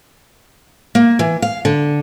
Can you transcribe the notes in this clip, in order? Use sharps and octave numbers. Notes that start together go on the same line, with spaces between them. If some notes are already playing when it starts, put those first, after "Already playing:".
A#3
E3
F5
D3